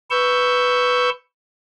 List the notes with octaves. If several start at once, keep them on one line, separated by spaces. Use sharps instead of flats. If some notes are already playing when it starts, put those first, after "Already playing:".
B4 C#6 E6 G6